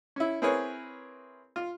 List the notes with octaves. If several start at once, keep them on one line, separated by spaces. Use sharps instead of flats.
C#4 E4
C4 E4 G#4 A#4 B4 C#5
F4